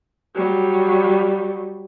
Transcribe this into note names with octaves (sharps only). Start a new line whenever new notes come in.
F#3 G3